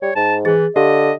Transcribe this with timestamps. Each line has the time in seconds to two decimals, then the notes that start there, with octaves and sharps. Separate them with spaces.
0.02 G3 C#5
0.16 G#2 A5
0.45 E3 G#4 A6
0.76 D3 G4 D#5 F5